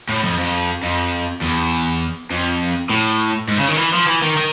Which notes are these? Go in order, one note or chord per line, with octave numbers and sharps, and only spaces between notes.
A2
F2
F2
F2
E2
F2
A2
G#2
C#3
D#3
E3
F3
E3
D#3
D#3